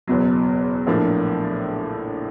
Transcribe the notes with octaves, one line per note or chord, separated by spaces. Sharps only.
F#1 E2 B2 F#3
A#1 A2 F3 A#3 D4